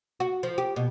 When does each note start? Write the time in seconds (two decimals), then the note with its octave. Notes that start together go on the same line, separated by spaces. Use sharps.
0.20 F#4
0.43 F3
0.58 G4
0.76 B2